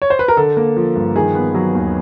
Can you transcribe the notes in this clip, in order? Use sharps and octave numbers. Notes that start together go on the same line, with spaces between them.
C#5
C5
B4
A#4
D3 A4
A#3
F3
G2
D#3 G#4
B3
F#3
D#2